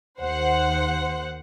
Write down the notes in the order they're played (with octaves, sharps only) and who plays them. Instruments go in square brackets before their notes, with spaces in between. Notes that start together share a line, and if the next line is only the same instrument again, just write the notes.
[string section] D#2 C5 F#5